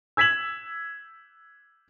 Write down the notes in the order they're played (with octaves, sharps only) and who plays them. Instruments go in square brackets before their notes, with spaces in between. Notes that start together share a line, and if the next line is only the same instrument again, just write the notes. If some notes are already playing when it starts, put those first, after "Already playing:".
[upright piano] E6 G#6 B6 E7 F#7